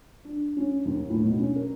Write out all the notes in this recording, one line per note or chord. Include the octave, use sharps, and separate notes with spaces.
D4
C#4
D#2
A2
B2
C#4
A#4